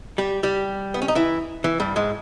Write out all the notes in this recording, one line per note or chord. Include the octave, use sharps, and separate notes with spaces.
G3 G4
G3 G4
B3
C#4
D#4
E3 E4
E3
G2 G3
G#2 G#3